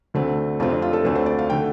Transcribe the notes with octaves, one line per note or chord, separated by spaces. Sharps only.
D2 D3 A3 C4
F2 C3 A3 C4 F4
D4
F4
A4
D2 D3 A3 C4 C5
C5
D5
F5
D3 A3 G5